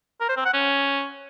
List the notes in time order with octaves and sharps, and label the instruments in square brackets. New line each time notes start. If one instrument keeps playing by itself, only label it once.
[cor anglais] A#4
C5
C4
F#5
C#4